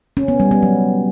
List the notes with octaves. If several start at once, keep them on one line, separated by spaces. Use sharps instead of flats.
C#4
B3
G3
B3
F#3